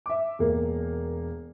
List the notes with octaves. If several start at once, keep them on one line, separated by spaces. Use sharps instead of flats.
E5 D6
E1 A#3